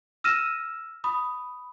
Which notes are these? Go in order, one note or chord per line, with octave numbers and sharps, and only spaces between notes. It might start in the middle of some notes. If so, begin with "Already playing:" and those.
E6 F6 A#6 D#7 E7
B5 D#6